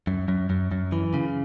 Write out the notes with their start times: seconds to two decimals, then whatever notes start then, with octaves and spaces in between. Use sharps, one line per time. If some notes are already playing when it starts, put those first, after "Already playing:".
0.07 F#2
0.28 F#2
0.50 F#2
0.71 F#2
0.92 E3
1.14 C#3